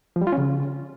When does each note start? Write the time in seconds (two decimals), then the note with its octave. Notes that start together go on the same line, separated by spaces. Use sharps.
0.16 F3
0.21 G3
0.27 F4
0.32 C#4
0.38 C#3